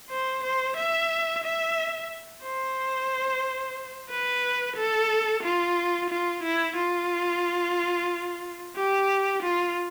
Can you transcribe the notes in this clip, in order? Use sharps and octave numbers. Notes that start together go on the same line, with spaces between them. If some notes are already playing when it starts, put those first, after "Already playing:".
C5
C5
E5
E5
C5
B4
A4
F4
F4
E4
F4
G4
F4